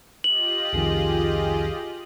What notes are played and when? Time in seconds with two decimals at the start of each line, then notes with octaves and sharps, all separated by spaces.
0.24 F4 G4 D#5 F#7
0.73 C2 F2 D#3 G#4